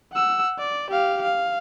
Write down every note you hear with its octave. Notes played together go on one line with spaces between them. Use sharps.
F#5 E6
D5
G4 F5
F5